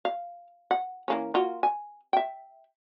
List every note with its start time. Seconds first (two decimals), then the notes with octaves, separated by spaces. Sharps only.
0.05 F5
0.71 F#5
1.08 E3 A#3 C#4
1.34 A#3 F4 F#4
1.63 G#5
2.13 E5 G5